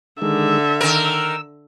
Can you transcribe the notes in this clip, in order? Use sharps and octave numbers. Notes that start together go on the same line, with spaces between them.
D3 D#3 G#3 E5
D#3 A#4 E6